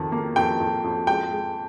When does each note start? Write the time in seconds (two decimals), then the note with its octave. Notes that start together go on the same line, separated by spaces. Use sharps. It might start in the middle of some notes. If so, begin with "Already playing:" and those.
Already playing: F2 D#3
0.12 A#3
0.36 F2 G5
0.60 F2
0.84 F2
1.07 G#3 G5
1.31 G#3